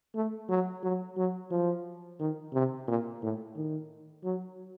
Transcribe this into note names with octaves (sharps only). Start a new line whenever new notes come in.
A3
F#3
F#3
F#3
F3
D#3
C3
A#2
A2
D#3
F#3